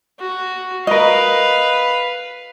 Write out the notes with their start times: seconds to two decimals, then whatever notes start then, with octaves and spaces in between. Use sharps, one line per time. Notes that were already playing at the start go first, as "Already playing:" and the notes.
0.19 F#4
0.87 A#4 B4 D#5 F5